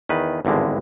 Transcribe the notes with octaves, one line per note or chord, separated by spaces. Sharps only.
E2 D#3 B4
G#1 E2 G2 D3 G#3